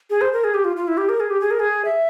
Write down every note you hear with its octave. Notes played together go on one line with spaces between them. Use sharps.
G#4
C5
A#4
G#4
G4
F4
F4
E4
G4
A#4
G#4
G4
G#4
A#4
G#4
E5